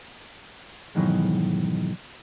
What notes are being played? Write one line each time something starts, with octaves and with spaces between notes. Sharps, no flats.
F2 G#2 B2 D#3 E3 F#3